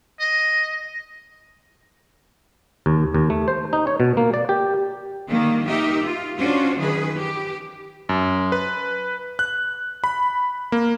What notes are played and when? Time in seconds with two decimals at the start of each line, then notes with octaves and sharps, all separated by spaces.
0.20 D#5
2.86 D#2
3.14 D#2
3.30 A3
3.48 C5
3.73 D#4
3.87 C#5
4.00 B2
4.17 A#3
4.34 D5
4.49 G4
5.28 D3 D#3 G3 A#3
5.68 D#4 G4 A#4 E5
6.03 F4
6.38 C#4 D4 F4 F#4 C5
6.78 D#3 E3 F#3 G#4 B4
7.17 G4
8.09 F#2
8.52 B4
9.39 F#6
10.04 B5
10.72 A#3